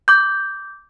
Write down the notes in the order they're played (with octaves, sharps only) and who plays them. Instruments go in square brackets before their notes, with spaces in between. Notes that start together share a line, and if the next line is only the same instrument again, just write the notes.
[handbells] D6 G6